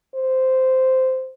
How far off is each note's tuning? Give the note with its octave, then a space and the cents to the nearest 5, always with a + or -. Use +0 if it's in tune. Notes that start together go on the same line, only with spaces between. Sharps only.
C5 -10